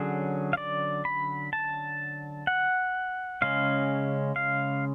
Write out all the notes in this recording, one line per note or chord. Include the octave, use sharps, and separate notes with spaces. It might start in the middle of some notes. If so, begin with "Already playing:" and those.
Already playing: D3 F#3 C#4 G#4
F5
D5
B5
A5
F#5
C#3 G#3 C#4 F5
F5